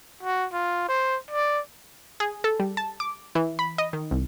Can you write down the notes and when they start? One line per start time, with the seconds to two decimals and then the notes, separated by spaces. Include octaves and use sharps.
0.23 F#4
0.53 F4
0.89 C5
1.31 D5
2.20 G#4
2.44 A4
2.60 G3
2.77 A5
3.00 D6
3.35 E3
3.59 B5
3.78 D#5
3.93 D#3
4.11 C2